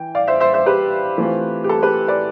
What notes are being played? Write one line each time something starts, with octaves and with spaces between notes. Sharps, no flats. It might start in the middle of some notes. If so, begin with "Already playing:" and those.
Already playing: E3 G5
D5 F5
C5 E5
C5 E5
C5 E5
G4 B4
E3 A3 C4 F4
G4
A4
G4 B4
B4 D5